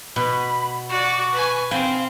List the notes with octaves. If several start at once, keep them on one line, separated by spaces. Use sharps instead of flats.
B2 B5
F#4 D5 C#6
B4 G#5
C4 F5 G5 G#5 B5